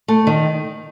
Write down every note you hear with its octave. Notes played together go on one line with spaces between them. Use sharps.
A3
D#3